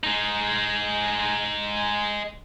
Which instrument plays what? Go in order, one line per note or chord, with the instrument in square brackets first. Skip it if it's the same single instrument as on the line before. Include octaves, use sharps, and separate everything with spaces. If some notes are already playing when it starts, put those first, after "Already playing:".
[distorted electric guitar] G#3 D#4